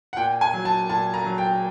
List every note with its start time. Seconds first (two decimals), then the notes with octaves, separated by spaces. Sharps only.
0.13 F#5
0.17 A#2 G5
0.41 G#5
0.53 F#3
0.65 A5
0.89 A#2 A5
1.14 A#5
1.26 F#3
1.38 G5